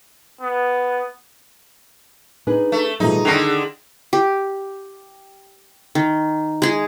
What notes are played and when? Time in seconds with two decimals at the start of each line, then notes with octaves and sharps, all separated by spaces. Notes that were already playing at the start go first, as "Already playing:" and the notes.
0.41 B3
2.47 D4 D#4 G#4 B4
2.72 A3
3.00 B2 E3 G3 A3 D#4 F4 G#4
3.25 D3 D#3 D4 A#6 C7 F7
4.13 G4
5.95 D#3
6.62 G#3 G#4